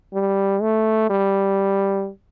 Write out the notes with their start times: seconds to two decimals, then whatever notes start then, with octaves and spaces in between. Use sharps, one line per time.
0.14 G3
0.62 A3
1.10 G3